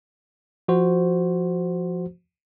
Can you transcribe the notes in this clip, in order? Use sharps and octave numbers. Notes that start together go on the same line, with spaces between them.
F3 F#4 C5